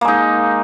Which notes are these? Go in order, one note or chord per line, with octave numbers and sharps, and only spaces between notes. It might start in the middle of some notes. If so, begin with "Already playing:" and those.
G#3 A#3 D#4